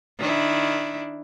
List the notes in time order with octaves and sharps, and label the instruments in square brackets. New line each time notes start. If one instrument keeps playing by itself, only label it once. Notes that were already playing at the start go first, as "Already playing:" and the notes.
[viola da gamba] D#3 D4 E4